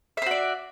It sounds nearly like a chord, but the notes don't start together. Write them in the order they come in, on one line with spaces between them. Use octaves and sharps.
E5 C5 F#4 D5